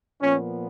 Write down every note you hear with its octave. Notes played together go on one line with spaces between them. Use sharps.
A#2 F3 B3 C#4